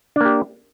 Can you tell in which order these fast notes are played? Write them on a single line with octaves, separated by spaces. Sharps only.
D4 A#3 G4